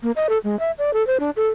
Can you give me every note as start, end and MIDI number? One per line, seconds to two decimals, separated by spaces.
0.03 0.11 58
0.16 0.27 75
0.29 0.38 69
0.44 0.58 56
0.59 0.71 76
0.78 0.93 74
0.93 1.05 69
1.07 1.18 72
1.20 1.30 62
1.37 1.47 69